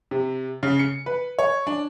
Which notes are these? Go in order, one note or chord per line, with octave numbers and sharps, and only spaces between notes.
C3
C#3
C#7
B4
C#5
D4